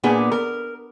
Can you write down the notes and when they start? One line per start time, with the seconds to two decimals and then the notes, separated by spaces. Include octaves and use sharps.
0.04 A#2 B3 D4 G#4
0.32 A#4